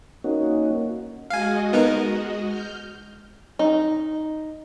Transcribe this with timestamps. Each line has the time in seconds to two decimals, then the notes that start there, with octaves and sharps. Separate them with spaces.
0.24 A#3 C#4 D#4 F#4
1.30 G#3 F#4 D#5 F5 G#5
1.73 B3 D#4 A#4
2.46 F6 G6
3.59 D#4